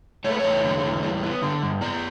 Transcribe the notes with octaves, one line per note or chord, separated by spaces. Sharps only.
A3 C#5
B4
C#5
E2
D3
E2
G3
B3
D3
G2
B3 D5